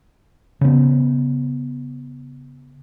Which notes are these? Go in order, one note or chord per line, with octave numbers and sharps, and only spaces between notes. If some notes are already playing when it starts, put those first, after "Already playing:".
C#3 B3